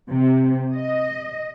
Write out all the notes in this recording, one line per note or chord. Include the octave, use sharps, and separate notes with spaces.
C3
D#5